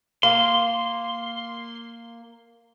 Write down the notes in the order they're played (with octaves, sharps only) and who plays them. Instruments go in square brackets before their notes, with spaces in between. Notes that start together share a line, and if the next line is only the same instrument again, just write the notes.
[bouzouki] A#3 [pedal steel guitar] C6